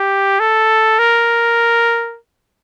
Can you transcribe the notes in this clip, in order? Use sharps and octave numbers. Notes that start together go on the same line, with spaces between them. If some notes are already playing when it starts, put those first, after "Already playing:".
Already playing: G4
A4
A#4